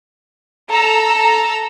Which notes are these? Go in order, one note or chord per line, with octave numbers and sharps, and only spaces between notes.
A4 A#5 E6